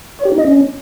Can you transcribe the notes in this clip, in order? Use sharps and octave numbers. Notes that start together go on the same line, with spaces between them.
C#5
G4
D#4
D#5
C#4